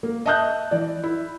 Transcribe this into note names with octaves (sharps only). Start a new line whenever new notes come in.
A#3
D#5 E5 A5 D#6 F#6 G6
E3 D5
E4